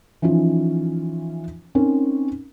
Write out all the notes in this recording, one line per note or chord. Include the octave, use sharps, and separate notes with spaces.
E3 F3 C#4 D#4 F4
C4 C#4 D#4 A#4